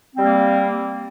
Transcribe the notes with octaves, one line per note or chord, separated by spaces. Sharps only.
G3 A#3 C4